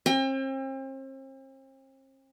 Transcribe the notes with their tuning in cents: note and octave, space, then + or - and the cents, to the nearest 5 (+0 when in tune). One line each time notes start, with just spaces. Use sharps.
C4 +40 G5 +40